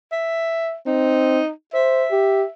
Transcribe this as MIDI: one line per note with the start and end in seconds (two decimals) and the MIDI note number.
0.12 0.75 76
0.86 1.40 60
0.86 1.50 63
1.74 2.05 72
1.74 2.51 76
2.11 2.43 67